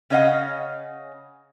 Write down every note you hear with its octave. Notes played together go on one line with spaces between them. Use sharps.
C#3 C#4 C#5 D#5 F5 F#5